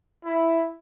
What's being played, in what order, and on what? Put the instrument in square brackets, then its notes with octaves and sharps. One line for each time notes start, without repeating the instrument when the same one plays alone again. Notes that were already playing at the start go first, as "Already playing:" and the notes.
[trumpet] E4